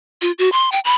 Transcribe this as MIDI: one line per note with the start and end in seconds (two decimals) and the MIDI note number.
0.22 0.32 65
0.39 0.52 66
0.52 0.72 84
0.72 0.80 79
0.85 0.96 83